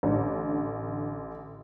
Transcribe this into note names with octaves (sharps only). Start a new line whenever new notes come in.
A1 D3